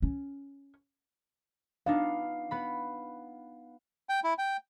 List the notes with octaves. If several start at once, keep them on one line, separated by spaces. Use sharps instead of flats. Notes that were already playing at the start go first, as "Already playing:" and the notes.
C#4
B3 D4 D#4 F5
B3 B5
G5
E4
G5